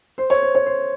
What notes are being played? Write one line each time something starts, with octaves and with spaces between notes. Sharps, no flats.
C5
C#5
C5
C#5
C5